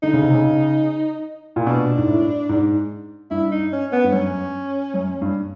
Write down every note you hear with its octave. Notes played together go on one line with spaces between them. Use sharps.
D3 D#4
C#3
C3
C#3
A#2
B2 D4
G#2
A2
G#2
G2 E4
D#4
C#4
B3
G2
F#2 C#4
F#2
G2